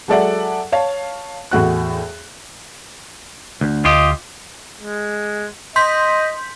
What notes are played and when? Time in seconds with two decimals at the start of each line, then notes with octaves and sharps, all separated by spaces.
0.08 F#3 G#3 A4 D5 E5 F#5
0.72 C#5 F5 A5
1.51 E2 A2 F#4 F#6
3.61 D2
3.85 D2 F4 G4 D#5
4.79 G#3
5.76 D#5 C6 G6 B6